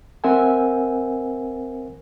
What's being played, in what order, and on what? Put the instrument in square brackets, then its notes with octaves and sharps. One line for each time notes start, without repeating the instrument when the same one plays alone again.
[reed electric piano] C4 A#4 C5 E5 F#5 G#5